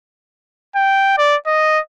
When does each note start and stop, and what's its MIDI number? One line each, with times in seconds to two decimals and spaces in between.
0.76 1.15 79
1.18 1.36 74
1.47 1.80 75